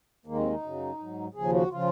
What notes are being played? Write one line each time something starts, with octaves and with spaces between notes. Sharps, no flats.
D#2 D#3 G#3 A#3
C4
D#4
F#2 C#3 F#3
G#2 F#3
D#2 C#3 F3 G#4
F#4
C#3 F3 F4